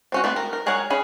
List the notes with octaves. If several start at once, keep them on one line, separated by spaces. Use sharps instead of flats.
C4 C#4 F#4
A3 B3 C4
A#4
A#4
F#3 G#4 A#4 C#5 F#5
C#4 G#4 B5